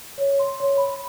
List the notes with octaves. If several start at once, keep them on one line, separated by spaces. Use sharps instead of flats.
C#5
C6
C#5
B5